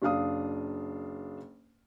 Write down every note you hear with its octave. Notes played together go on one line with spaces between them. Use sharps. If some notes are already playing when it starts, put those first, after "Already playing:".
F#1 D4 F5 D#6